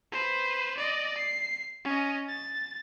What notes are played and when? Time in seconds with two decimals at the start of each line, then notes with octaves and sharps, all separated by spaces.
0.12 B4 C5
0.77 D5 D#5
1.17 C7
1.85 C#4 D#5
2.29 A6